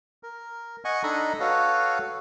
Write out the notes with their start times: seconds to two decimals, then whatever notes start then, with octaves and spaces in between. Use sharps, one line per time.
0.23 A#4
0.85 D#5 F#5 G#5 C#6
1.03 D4 D#4 A4 D#5 A#5 B5
1.40 F#4 A4 B4 C#5 F5